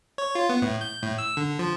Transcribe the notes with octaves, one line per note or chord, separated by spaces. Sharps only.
C#5
F4
B3
A2
G6
A2
E6
D3
F3